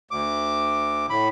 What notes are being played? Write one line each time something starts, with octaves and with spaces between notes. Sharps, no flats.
D2 D6
A2 B5